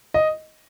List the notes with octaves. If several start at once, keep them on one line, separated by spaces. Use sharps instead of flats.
D#5